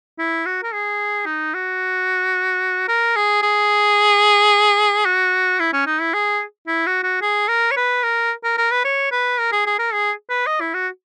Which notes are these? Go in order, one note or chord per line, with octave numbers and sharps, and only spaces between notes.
E4
F#4
A#4
G#4
D#4
F#4
A#4
G#4
G#4
F#4
E4
C#4
D#4
E4
G#4
E4
F#4
F#4
G#4
A#4
C#5
B4
A#4
A#4
A#4
B4
C#5
B4
A#4
G#4
G#4
A#4
G#4
B4
D#5
E4
F#4